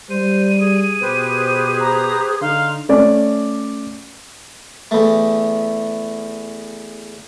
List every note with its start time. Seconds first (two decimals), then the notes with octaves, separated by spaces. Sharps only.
0.10 G3 C5 D#7
0.61 G#4
1.02 B2 G4 B4 C5
1.80 A#5
2.41 D3 D#4 F5 C6
2.89 A3 C#4 D5
4.91 E2 A3